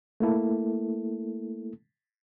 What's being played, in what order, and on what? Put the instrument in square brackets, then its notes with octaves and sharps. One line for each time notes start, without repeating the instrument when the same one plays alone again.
[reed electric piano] A3 A#3 E4 A4